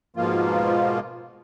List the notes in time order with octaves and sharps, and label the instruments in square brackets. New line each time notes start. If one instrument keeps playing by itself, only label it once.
[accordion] G#2 B2 F3 A#3 F4